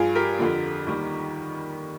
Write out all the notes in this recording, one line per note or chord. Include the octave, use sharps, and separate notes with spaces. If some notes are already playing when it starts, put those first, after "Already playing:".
Already playing: G2 F3 F4 G#4
G4 A#4
F2 D3 F3
D#2 D#3 G3